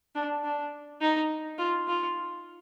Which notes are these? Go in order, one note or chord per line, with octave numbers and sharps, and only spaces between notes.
D4
D4
D#4
F4
F4